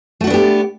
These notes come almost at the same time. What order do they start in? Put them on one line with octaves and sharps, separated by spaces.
A3 F#4 D4 B3 G4